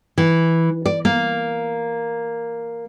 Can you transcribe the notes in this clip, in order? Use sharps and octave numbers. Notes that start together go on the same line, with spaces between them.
E3
D5
A#3